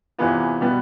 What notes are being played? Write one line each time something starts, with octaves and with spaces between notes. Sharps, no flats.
E2 C3 E3 B3 F4
B2 G3 B3